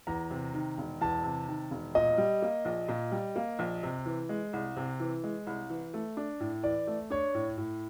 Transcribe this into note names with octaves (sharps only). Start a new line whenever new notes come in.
E2 A#5
C3
D#3
E1
E2 A5
C3
D#3
E1
A#2 D#5
G3
A#3
A#1
A#2
G3
A#3
A#1
C3
E3
G#3
C2
C3
E3
G#3
C2
E3
A3
D4
A2
E3 D5
A3
D4 C#5
A2
A2